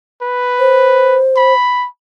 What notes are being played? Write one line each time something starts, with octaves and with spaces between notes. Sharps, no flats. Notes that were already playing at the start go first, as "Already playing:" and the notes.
B4
C5
B5